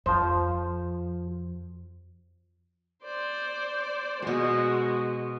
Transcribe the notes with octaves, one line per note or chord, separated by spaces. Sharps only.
F2 F3 C5
C5 D5
B2 G#3 F#4 C5